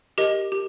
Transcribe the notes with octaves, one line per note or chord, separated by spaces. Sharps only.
G4 A#4 D#5
G4